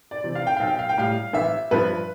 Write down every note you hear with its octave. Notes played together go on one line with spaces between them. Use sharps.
D5
C3 E3
F5
G5
B1 F5
G5
F5
G5
A2 G3 F5
A1 E5
G2 F3 B4